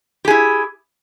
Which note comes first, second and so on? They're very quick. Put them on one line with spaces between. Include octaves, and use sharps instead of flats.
G4 G#4 E4